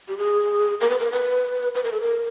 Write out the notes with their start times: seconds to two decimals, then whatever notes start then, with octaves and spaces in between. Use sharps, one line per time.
0.08 G4
0.18 G#4
0.81 A#4
0.90 B4
1.00 A#4
1.12 B4
1.75 B4
1.84 A#4
1.92 A4
2.01 A#4